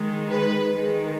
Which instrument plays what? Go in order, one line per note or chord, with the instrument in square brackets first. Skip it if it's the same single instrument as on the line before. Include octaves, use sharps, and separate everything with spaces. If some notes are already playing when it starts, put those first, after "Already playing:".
Already playing: [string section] D#3 G#3
B4
D#3 G#3